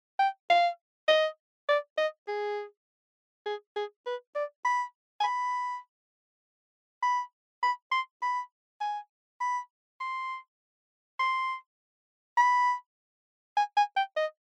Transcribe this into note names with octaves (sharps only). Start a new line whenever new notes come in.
G5
F5
D#5
D5
D#5
G#4
G#4
G#4
B4
D5
B5
G#5
B5
B5
B5
C6
B5
G#5
B5
C6
C6
B5
G#5
G#5
G5
D#5